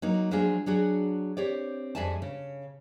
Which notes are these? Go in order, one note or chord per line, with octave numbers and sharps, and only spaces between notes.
F#3 A#3 D#4
F3 F#3 G#3 D4 F4 G#4
F#3 D4 F#4 G#4
C4 G4 C#5 D5
F2 G#3 D5 E5 G#5 A5
C#3